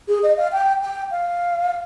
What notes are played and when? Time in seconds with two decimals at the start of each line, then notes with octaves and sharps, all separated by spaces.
0.08 G#4
0.22 D#5
0.37 F5
0.52 G5
0.81 G5
1.11 F5